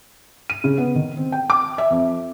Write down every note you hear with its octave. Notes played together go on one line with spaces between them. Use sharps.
D#7
C#3
B3
D#3
C4
G5
D6
E5
F2